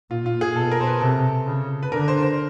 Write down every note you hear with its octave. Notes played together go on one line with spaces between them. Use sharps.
A#2 F4
F4
G#4
B2 A4
A#4
C5
B4
C3 A4
C#3
B4
D3 A#4
C5
C5